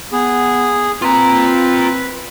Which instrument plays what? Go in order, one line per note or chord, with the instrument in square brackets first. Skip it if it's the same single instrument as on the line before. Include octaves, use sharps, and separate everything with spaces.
[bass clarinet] B3 [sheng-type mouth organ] G#4
[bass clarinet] C4 [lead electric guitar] F4 A#5 [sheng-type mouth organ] B4